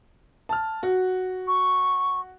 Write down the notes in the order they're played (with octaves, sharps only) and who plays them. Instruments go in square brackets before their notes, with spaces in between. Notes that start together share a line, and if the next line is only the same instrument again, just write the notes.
[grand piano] A5 F6
F#4
[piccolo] C#6